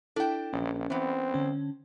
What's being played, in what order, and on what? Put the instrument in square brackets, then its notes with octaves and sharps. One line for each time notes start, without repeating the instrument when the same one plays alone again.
[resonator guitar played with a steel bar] D4 G5 [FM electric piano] E4 A4
[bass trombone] A#1 [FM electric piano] C#4
[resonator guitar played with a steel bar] E3 B3 [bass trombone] C4
[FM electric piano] D3 C#4